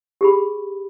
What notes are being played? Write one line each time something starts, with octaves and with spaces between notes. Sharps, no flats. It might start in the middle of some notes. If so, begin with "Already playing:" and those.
G4 G#4 B5